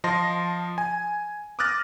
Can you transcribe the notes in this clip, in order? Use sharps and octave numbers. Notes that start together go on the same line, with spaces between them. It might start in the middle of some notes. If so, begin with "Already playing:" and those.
F3 D#5 A5 C6 A#6
G#5
D6 D#6 F6 F#6 A6 A#6